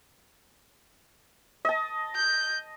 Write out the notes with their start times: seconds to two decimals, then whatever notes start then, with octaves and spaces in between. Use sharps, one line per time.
1.65 D#5 A5
2.16 G6